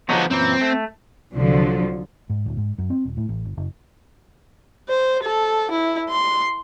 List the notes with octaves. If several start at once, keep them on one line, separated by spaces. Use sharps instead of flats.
D3 F3 F#3 B3 D#4
F#2 A#2 E3 C4
A3
C2 D3 F3 F#3
G#2
D1
G#2
F#2
C4
D#1
A2
A1
G1
F#1
C5
A4
E4
C6